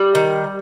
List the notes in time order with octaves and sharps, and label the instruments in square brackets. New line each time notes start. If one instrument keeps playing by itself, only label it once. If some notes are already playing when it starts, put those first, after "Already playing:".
Already playing: [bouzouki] G3
D#3